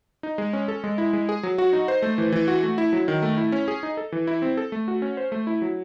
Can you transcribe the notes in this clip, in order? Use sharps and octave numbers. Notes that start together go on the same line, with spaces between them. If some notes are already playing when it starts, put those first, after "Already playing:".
D#4
G#3
C#4
A4
G#3
E4
G#3
G#4
F#3
F#4
D#4
C5
A3
E3
E3
F#4
A3
E4
F#3
D#3
A3
E4
C#4
G#4
D#4
A4
E3
E4
C4
A4
A3
F#4
C#4
C5
A3
E4
F#3